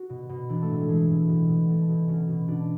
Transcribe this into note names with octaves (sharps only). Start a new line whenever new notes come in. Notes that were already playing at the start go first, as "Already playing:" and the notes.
Already playing: F#4
B2
B2
E3 D4
A3
A2
G#3
E3 G#3
A2
B2
B2
B2 A3
B2
B2 C#4
B2
B2 D4